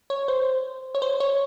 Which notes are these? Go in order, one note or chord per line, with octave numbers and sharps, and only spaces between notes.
C#5
C5
C#5
C5
C#5